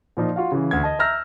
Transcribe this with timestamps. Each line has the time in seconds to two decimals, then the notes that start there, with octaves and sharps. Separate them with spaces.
0.17 A#2 F3 D#4
0.36 F4 F#4 F5
0.52 C#3 E3
0.71 D2 G#6
0.83 D#5 A5
0.99 E5 A#5 E6 F6 G6 A#6